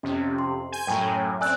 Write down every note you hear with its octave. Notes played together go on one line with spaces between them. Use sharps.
F2 C3 C#4
C6
G#5 G6 G#6
F#2 A2 G5 G#5 A#5
C4 D5 G#5 E6 F#6